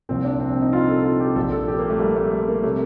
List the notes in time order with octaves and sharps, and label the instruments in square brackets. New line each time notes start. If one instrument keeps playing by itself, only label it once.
[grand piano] C2 A#2 F3 C4
D4
C4
C4
D#4
F4
A4
F4
G4
A#1 A#2 F3 A4
A4
G4
A#3
A3
G3
A3
A3
A#3
C3 G3 A3